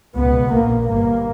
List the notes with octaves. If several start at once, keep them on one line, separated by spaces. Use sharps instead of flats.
C#2 B2 B3
A#1 A#2 A#3
G1 G2 A#3